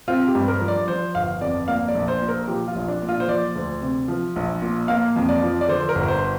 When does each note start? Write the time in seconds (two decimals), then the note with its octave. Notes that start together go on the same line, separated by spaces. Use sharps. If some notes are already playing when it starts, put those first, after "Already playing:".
0.08 C4 F4
0.28 G4
0.35 G2
0.48 A#4
0.61 F3
0.68 D5
0.87 F3 C5
1.15 G1 F5
1.41 F2 D5
1.68 A#3 F5
1.88 D5
1.95 A#1
2.08 C5
2.22 A#2
2.28 A#4
2.48 F3 G4
2.68 F4
2.75 A#1
2.88 D4
3.02 A#2
3.09 F4
3.20 C5
3.28 F3 D5
3.55 D2
3.81 C3
4.08 F3
4.36 A#1
4.62 A#2
4.88 A#3 F5
5.16 F2
5.29 D5
5.42 F3
5.61 D5
5.68 D3 C5
5.89 A#4
5.95 G1
6.08 C5